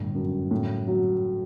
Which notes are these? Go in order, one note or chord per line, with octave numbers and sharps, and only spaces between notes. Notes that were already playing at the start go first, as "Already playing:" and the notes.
Already playing: G1 A2
F#2
A2
F#3